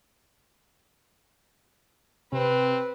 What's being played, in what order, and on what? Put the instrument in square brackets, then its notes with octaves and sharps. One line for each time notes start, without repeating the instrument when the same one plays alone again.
[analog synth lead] C3 [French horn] C4 [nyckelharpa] B4